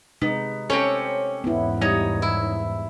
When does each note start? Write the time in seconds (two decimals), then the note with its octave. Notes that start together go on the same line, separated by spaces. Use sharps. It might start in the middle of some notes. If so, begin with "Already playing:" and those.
0.22 C3 G#3 B3 D#4
0.70 C4 C#4 G4 A4 C#5
1.44 E2 G#2 B3 E4
1.81 G3 D#4 C#5 D#5
2.22 E4